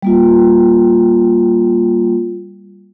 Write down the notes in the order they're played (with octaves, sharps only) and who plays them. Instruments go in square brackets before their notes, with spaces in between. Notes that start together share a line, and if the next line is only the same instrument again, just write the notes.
[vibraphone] G3 A#3 F4